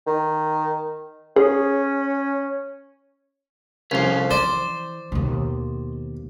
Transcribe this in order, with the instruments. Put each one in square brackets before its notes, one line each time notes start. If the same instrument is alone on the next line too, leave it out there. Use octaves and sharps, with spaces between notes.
[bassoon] D#3
[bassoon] C#4 [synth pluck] G#4
[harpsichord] C2 F2 [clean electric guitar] C#4 F4
[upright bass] E3 [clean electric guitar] C5 [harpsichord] D5
[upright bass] D#2 B2